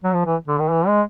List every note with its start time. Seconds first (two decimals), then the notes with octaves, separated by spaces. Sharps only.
0.04 F#3
0.14 F3
0.26 E3
0.48 D3
0.59 D#3
0.70 E3
0.87 G#3